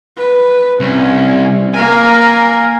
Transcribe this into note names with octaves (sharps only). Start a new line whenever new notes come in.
B4
C2 C#4
A#3 A#4 G#5